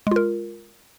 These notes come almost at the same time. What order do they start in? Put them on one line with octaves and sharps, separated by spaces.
G#3 F4 A#4